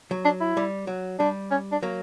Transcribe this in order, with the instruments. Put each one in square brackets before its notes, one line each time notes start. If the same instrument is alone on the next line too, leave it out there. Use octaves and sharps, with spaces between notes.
[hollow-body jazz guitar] F#3
[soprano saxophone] D4
E4
[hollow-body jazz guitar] G3
F#3
[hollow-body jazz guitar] G3 [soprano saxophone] D4
[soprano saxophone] C#4
D4
[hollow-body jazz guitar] F#3 A#3